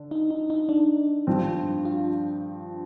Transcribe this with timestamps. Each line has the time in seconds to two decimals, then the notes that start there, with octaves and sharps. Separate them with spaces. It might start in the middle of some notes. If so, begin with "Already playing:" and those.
Already playing: D3 D4
0.11 D#4
0.30 D#4
0.50 D#4
0.69 D4
1.27 G2 F3 C4
1.85 F4